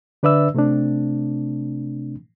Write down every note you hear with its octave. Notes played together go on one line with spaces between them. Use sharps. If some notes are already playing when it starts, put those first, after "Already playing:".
D3 D4 B4 D5 E5 E6
C3 A3 C4 D4